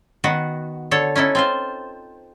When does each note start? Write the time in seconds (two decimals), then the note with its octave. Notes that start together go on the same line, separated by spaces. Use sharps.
0.24 D#3 B3 F#4
0.91 D3 A4 C#5
1.16 C#4 D#4 E4 A4
1.35 C4 F4 C5